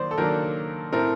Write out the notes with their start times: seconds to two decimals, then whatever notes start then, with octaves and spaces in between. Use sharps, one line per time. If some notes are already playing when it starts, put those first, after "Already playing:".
Already playing: D#3 F#3 A#3 C5 D5
0.11 A4
0.18 D#3 F#3 A#3 D4 A#4
0.92 A2 A3 C4 A#4